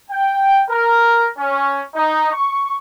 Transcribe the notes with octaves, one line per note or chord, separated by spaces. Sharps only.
G5
A#4
C#4
D#4
C#6